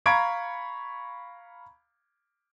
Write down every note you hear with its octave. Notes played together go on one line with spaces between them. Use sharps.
F5 A#5 B5 C#6 G#6 D7